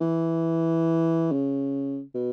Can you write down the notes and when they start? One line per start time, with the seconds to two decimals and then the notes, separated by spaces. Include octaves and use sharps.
0.01 E3
1.32 C#3
2.15 B2